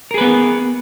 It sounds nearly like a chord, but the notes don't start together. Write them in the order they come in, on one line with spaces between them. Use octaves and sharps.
A#4 G#4 B4 B3